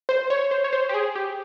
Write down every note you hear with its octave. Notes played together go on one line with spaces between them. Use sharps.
C5
C#5
C5
C#5
C5
G4
G#4
G4